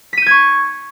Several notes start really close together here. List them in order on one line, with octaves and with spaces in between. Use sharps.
B6 D#7 G6 G#6 C#6